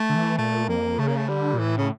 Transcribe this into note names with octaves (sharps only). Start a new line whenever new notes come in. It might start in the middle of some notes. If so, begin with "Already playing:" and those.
Already playing: A3
D3
E3
A#2 A3
F2 A#3
C#3 A3
A#3
A3
D3 G3
A#2
A2 E3
C#3